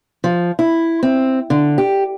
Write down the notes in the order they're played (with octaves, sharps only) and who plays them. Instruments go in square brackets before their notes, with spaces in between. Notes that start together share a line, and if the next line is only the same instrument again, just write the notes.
[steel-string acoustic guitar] F3
E4
C4
D3
G4